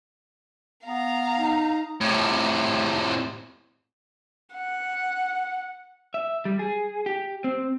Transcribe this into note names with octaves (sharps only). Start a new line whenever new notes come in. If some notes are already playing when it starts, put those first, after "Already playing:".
B3 F5 A#5
D#4
A2 C3
F#5
E5
G3
G#4
G4
C4